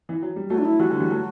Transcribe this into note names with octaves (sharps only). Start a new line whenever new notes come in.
E3
F#3
G3
F#3 A3 F#4
D4
E4
E3 G3 F#4
D3 F#3
E3 G3
F#3 A3